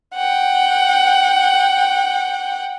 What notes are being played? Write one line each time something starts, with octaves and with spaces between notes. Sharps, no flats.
F#5 G5